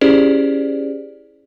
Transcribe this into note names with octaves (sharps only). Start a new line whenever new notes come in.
C#4 E4 G4 G#4 C5 D5